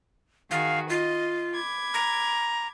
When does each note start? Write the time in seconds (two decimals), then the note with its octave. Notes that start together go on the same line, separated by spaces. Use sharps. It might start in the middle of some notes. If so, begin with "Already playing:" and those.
0.51 D#3 F#4 G#4 F5
0.90 F4 D#5
1.54 B5 D6 G#6
1.94 A#5